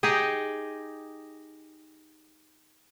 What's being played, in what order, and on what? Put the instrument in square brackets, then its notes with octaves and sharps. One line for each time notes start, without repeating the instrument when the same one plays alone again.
[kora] D#4 G4 G#4 D#5